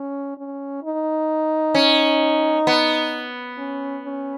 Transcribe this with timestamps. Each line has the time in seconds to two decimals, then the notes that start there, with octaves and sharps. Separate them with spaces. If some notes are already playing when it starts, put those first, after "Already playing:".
Already playing: C#4
0.37 C#4
0.83 D#4
1.75 C#4
2.67 B3
3.58 C#4
4.04 C#4